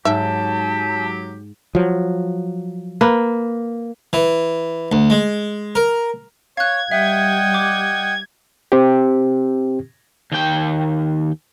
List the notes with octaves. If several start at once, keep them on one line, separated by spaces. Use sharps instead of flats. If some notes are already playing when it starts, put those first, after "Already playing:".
G#2 F#3 G4 E5 A5
F3 F#3
A#3 B4
E3
D2
G#3
A#4
C#5 F5 F#6 G#6
G3 D#5 E5 F#5 G5
D6
C4 G4
D#2 G5